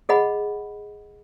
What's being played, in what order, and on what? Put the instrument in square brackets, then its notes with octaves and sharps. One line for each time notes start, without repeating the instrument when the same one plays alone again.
[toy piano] G#4 D#5 F#5 B5